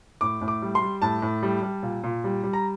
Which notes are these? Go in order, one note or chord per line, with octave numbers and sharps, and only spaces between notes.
A2 D6
A2
D6
G3
C6
G3
A2 A5
A2
G3
G3
A#2
A#2
G3
G3
A#5